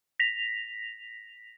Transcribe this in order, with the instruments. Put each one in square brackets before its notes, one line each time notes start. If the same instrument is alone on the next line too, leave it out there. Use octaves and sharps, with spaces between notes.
[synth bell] A#6 B6 F7